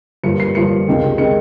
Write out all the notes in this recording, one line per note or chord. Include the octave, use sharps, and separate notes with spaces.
G1 G2 F3 A#3 C#7
C7
G1 G2 F3 A#3 C#7
C#2 C3 D#3 G#3
C3 D#3 G#3 C#7